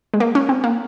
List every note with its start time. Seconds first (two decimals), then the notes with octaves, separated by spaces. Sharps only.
0.14 G#3
0.20 A#3
0.35 C#4
0.49 C4
0.64 A#3